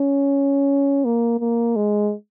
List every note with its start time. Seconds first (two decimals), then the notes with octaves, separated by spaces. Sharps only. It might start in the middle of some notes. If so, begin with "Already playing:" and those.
Already playing: C#4
1.05 A#3
1.40 A#3
1.76 G#3